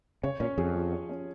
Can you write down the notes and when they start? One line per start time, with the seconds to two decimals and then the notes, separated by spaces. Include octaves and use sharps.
0.23 C#3 C#5
0.40 A#2 C#4
0.58 F2 G#4
0.75 F3
0.92 C#5
1.09 C#4